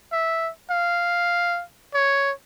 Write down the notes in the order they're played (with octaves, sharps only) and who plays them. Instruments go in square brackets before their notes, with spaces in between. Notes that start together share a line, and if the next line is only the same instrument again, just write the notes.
[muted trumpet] E5
F5
C#5